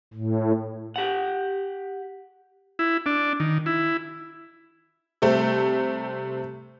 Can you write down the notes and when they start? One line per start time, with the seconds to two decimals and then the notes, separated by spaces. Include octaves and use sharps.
0.14 A2
0.96 G4 F#5
2.79 E4
3.06 D4
3.40 D#3
3.66 E4
5.22 C3 G3 A3 C4